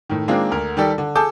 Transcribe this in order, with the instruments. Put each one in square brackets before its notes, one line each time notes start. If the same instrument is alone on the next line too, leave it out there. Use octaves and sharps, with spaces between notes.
[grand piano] A2 D#3
D#3 G#3 A#3 C4 D4 F4
D2 A#4
D#3 G3 G4 A4 D5
D3
G#4 A4 A5 D6 G6